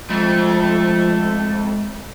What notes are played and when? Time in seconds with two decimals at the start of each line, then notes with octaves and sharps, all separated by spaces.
0.10 F2 F3 G#3 A3